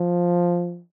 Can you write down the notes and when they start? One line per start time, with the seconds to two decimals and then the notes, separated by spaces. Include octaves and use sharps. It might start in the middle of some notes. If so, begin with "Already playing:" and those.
Already playing: F3